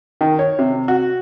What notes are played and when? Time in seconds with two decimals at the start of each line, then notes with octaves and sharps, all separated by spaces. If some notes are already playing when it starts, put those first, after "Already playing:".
0.21 D#3
0.39 C#5
0.59 C3
0.88 F#4